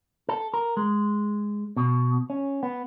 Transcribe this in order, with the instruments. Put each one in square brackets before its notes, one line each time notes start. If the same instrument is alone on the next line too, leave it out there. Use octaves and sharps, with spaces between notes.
[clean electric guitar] A4
A#4
G#3
B2
C#4
B3